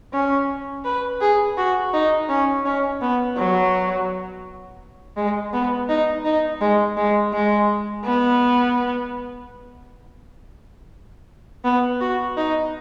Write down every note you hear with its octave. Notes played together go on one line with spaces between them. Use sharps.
C#4
B4
G#4
F#4
D#4
C#4
C#4
B3
F#3
G#3
B3
D#4
D#4
G#3
G#3
G#3
B3
B3
F#4
D#4